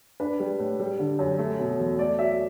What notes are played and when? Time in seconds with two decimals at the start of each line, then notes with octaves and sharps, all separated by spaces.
0.20 D4 B4
0.40 G3
0.59 A2
0.79 G3
0.99 D3
1.19 F#2
1.39 A3
1.59 B2
1.79 E2
1.99 A3 D5
2.19 F#3 E5